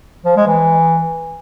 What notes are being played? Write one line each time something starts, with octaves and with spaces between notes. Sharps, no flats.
F3
G#3
E3